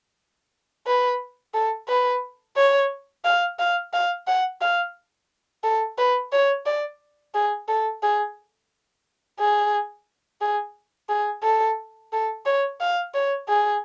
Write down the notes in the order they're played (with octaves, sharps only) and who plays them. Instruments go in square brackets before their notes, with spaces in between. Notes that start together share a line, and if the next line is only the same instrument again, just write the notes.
[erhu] B4
A4
B4
C#5
F5
F5
F5
F#5
F5
A4
B4
C#5
D5
G#4
A4
G#4
G#4
G#4
G#4
A4
A4
C#5
F5
C#5
G#4